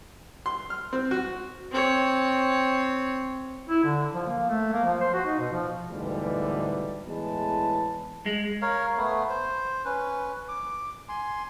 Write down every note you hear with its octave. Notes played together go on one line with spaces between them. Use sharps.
C6
F6
C4
F#4
C4 C#5
E4
D3
F3
A#3
A3
A#3
F3
C5
F#4
D#4
B2
F3
D2 G#2 B2 D3 E3 G3
E2 A2 G#3 B4 A5
G#3
A#4 C#5 F5
A3 B3
C5
C#4 B4
D6
G#5 C6